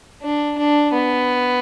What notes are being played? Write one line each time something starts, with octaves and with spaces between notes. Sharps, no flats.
D4
D4
B3